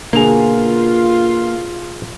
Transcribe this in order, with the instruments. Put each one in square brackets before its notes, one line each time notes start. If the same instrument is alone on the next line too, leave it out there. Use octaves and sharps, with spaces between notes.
[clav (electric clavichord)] B2 G#4 [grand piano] D3 F7 [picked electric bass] A#3 [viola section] F4